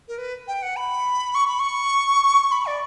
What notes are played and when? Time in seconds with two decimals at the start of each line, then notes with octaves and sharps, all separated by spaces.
0.08 A#4
0.18 B4
0.48 G5
0.62 F#5
0.76 B5
1.35 C#6
1.47 B5
1.59 C#6
2.52 B5
2.66 D5